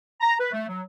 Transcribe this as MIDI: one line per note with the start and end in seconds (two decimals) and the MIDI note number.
0.21 0.34 82
0.39 0.52 71
0.52 0.65 57
0.68 0.81 54